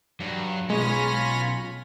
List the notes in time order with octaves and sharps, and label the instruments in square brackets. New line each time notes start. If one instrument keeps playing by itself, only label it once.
[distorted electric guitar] G2 [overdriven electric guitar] F#3
[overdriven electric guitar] B1 [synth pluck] G#3 [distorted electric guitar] C#4 C#5 [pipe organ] F4 B5 A#6